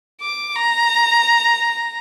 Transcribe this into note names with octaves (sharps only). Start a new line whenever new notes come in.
D6
A#5